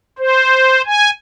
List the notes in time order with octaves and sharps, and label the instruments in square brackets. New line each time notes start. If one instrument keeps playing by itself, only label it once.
[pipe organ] C5
G#5